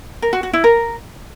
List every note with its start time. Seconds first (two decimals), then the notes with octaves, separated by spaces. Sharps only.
0.22 A#4
0.33 F#4
0.43 F#4
0.53 E4
0.64 A#4